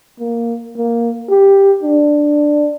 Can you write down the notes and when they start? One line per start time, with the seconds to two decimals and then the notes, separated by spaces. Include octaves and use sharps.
0.19 A#3
0.77 A#3
1.30 G4
1.83 D4